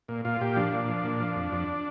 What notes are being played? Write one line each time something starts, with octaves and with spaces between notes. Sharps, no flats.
A#2
A#2 F4
A#2 G4
F3 D4
A#2
F3
A#2
F3
F2
F2